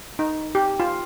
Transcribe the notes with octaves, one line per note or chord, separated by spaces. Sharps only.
D#4
G4
F4